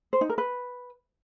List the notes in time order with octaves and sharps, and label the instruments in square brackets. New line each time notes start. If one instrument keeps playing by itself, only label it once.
[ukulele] C5
D#4
A#4
B4